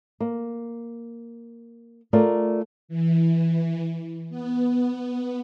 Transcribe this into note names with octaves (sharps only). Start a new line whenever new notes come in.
A#3
A3 F4 A#4 D5
E3
B3